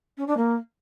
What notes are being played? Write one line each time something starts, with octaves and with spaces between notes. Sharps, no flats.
C#4
D4
A#3